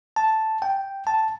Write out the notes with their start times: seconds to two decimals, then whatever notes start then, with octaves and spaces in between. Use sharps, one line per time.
0.16 A5
0.62 G5
1.07 A5